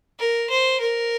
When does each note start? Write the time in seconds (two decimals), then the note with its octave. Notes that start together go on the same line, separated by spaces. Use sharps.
0.19 A#4
0.50 C5
0.81 A#4